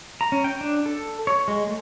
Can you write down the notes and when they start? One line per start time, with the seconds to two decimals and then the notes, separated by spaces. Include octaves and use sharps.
0.21 A#5
0.32 C#4
0.44 G5
0.61 D4
0.86 A4
1.27 C#5
1.48 G#3
1.67 A3